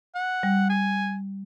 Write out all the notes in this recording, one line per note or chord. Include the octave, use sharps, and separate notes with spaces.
F#5
G3
G#5